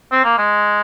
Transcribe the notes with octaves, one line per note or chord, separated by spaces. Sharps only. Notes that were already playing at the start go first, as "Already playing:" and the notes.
C4
A#3
G#3